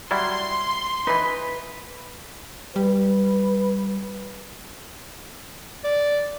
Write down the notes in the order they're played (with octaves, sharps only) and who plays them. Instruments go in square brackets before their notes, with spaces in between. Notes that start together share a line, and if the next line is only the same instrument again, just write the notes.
[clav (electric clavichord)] F#3 G3 E4 [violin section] C6
[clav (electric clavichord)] E3 D#4 [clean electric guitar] B4
[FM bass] G3 [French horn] B4
[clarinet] D5